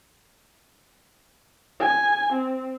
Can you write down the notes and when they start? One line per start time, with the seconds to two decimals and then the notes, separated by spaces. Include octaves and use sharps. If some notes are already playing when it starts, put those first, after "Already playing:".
1.80 G#5
2.33 C4